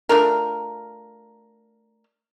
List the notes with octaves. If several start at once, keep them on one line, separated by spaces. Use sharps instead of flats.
A3 D4 F4 A#4